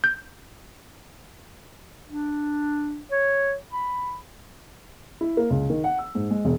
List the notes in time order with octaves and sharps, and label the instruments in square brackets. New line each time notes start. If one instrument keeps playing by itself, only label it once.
[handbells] G6
[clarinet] D4
C#5
B5
[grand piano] E4
A#3
C#2
D#3
F#5
E6
G#2
G#3
E1